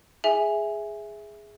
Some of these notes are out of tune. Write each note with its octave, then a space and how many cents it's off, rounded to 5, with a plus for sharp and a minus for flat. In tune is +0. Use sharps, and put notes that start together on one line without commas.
G#4 +0 E5 +0 G#5 +0